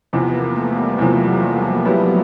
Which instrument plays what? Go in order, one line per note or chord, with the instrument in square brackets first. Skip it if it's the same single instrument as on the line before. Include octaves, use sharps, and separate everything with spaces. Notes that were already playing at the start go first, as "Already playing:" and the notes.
[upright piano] E2 C3 F3 [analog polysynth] B3
[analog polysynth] A#3
A3
G3
[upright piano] E2 C3 F3 [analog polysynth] F#3
[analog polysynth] F#3
F3
[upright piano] F#3 B3 E4 G4